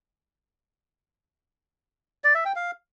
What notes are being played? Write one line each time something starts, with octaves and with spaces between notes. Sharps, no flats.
D5
E5
G5
F5